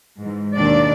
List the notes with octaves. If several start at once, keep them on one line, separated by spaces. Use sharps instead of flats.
G#2 E3
D#2 B2 D#3 D4 D5